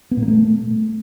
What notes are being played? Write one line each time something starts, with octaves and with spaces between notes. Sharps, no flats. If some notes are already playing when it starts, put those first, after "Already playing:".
B3
A#2
A#3
A3